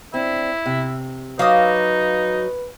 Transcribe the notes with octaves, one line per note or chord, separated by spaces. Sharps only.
C4 D4 E4
C3
F#3 D#4 B4 F5 D6 D#6